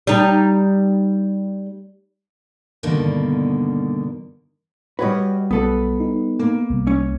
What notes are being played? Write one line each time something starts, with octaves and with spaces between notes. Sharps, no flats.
G3 D#4
G2 B2 D3 D#3 A#3
G3 F#4 B4 C#5 D#5
B1 B3 A4 B4
D#4
A#3
C2
C#4